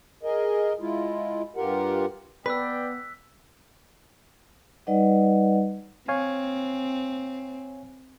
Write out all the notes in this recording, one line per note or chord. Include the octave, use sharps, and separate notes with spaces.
G#4 A#4 D#5
G#3 E4 F4
G2 F4 G4 A#4 F#5
B3 B4 D5 G5 E6 F#6 B6
G3 D#4 B4 D5 D#5 F#5
C4 C#5 F5 G#5